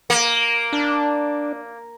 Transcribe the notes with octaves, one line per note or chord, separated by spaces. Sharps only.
A#3
D4